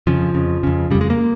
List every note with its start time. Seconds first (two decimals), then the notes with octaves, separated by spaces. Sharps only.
0.07 F2 C#3 F3
0.34 F2 C#3
0.63 F2 C#3
0.91 F2 C#3 G3
1.01 G#3
1.10 A#3